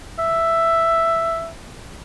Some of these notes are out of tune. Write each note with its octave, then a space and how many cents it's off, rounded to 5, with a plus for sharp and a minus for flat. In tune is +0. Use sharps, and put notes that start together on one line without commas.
E5 +5